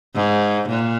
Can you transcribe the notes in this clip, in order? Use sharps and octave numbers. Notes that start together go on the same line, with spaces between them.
G#2
A#2